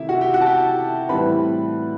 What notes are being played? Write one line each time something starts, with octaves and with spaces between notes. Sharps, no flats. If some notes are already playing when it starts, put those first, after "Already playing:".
Already playing: C3 D#3 A3 E4 E5
F#4 F#5
G4 G5
F#4 F#5
A5
G4 G5
A2 E3 G3 C4 B4 B5